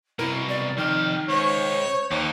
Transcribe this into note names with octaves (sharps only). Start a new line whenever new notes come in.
C2 B2 E4 A#4
D5
F2 D#3 G4 F6
C#2 C5 C#5
D#2 A#3 D#4